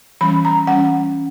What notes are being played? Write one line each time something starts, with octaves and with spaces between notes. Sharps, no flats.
E3 G3 C#4 B5
A#5
E3 G3 C#4 F#5